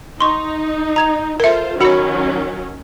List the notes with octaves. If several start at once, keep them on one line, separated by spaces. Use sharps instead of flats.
D#4 C6 C#6
A#5 G#6 F7
F4 A4 A#4 C5 E5
D#3 F#3 C#4 F#4 C#5 F#5 B5 C#7